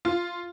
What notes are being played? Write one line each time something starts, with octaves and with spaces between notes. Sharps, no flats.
F4